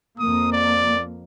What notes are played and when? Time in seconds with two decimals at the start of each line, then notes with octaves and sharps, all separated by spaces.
0.19 F2 A#3 D#6
0.52 D5